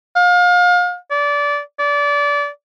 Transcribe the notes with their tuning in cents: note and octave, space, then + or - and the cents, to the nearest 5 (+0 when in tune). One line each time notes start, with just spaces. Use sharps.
F5 +35
D5 -20
D5 -25